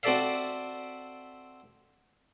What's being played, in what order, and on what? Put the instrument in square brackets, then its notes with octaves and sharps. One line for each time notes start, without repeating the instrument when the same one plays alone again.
[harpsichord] C4 F#4 A4 D5 E5 F5